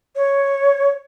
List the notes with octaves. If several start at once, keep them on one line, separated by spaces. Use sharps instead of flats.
C#5